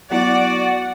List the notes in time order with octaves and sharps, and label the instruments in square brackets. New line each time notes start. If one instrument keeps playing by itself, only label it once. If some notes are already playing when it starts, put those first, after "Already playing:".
[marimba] F#3 B3 E4 [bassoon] F#4 [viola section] D5 [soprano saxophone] F#5